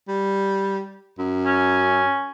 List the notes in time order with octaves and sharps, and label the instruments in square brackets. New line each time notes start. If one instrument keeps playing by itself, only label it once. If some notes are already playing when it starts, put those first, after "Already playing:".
[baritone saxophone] G3
F#2
[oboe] C#4